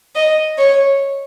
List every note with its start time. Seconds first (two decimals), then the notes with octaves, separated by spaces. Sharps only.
0.16 D#5
0.58 C#5